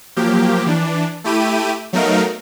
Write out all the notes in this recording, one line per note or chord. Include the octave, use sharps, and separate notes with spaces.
F3 F#3 A#3 G4
E3 D4
A3 E4 G4 D#7
F#3 A3 B3 D#4 A#4 F5